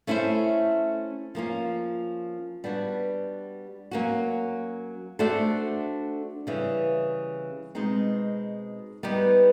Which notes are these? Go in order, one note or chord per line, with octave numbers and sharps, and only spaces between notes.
A3 C#4 E4 A4 C5
F3 A#3 C#4 F4
G3 B3 D4 F#4
F#3 A#3 C#4 F#4
A3 D4 F#4 A4 C5
C#3 E3 G3
B2 G#3 C4 D#4
G3 B3 D#4 G4 B4